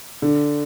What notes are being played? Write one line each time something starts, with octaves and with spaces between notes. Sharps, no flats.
D3